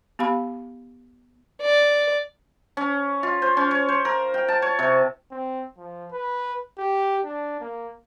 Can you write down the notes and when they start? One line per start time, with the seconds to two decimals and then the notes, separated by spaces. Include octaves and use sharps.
0.19 B3 G4 F5 B5
1.62 D5
2.77 C#4
3.23 F4
3.42 C5
3.57 C#4
3.71 C#5
3.89 C5
4.05 A#4
4.34 G5
4.48 A5
4.62 C#5
4.79 C3
5.31 C4
5.77 F3
6.11 B4
6.78 G4
7.25 D4
7.60 A#3